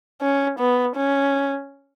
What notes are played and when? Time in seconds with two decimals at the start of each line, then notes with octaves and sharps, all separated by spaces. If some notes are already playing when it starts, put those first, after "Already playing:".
0.21 C#4
0.59 B3
0.95 C#4